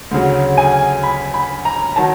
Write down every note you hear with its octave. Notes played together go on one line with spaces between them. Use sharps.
D2 C#3 F#3
G#5
B5
B5
A#5
D#3 F#3 A5